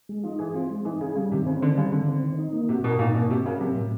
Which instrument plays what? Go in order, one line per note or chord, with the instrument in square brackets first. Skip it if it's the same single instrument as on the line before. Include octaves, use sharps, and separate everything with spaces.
[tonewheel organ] G#3
[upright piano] F3 [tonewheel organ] D#4
[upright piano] E3 [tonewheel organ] G#4
[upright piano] F3 [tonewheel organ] C4
[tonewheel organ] G#3
[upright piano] E3 [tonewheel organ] D#4
[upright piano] C#3 [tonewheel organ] G#4
[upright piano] C#3 [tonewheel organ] G3
[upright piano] C3 [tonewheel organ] D#3
[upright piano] C#3 [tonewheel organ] C4
[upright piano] D3 [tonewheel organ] D#3
[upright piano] C#3 [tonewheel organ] G3
[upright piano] D3 [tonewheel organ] D#3
[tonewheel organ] C4
D#3
D#4
A#3
[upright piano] C3 [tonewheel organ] F#4
[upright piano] B2 [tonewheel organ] A#4
[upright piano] A#2 [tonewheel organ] D#4
[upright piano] B2 [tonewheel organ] A#3
[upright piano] C3 [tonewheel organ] F#4
[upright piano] C#3 [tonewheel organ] A#4
[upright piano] C3 [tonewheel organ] F#3
[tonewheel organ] A2